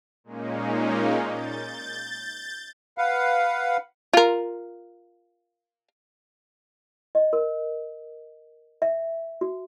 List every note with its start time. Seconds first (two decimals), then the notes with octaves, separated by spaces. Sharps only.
0.24 A#2 G#3 A#3 C#4 D#4
1.23 G6 A6
2.98 B4 F5 F#5
4.13 F4 A#4
7.15 D#5
7.33 A#4
8.82 E5
9.41 F#4